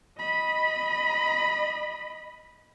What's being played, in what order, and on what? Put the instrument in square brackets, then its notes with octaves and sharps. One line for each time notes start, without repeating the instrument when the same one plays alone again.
[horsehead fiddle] D#5 B5